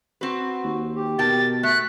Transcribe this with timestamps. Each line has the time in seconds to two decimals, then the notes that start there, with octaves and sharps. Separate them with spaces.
0.21 C4 F#4 B4
0.64 D#2
0.96 G4
1.19 B2 A#4 G5 A5 A6
1.63 A3 F#6 B6